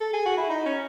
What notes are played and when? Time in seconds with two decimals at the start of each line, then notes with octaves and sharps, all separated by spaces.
0.01 A4
0.13 G#4
0.26 F#4
0.37 E4
0.50 D#4
0.66 C#4